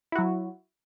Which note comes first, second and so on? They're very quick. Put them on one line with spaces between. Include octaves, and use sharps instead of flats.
E4 F#4 F#3